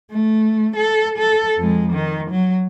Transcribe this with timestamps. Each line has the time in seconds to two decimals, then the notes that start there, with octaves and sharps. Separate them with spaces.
0.11 A3
0.76 A4
1.18 A4
1.58 F2 G#3
1.92 D#3
2.31 F#3